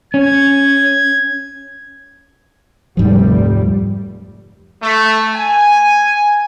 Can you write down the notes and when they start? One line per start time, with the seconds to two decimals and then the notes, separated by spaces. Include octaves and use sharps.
0.14 C#4 G#6
2.97 F1 D2 G#2 F3 G3
4.83 A3
5.35 G#5